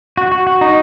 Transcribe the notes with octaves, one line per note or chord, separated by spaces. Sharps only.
F#4
F#4
F#4
D#4